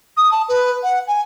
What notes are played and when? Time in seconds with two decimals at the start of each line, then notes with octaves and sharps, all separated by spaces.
0.17 D#6
0.31 A5
0.48 B4
0.83 F#5
1.07 G#5